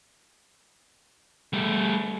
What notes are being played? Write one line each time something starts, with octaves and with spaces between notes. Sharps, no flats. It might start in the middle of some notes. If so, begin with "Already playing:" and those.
G3 A3